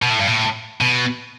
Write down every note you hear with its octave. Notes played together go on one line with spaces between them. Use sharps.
B2
A2
G2
A2
B2